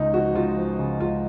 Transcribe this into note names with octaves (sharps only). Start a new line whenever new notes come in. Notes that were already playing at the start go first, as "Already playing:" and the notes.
Already playing: C#2 C#3 D#4
F3 F#4
C#2 F4
F3
C#3
C#2 F4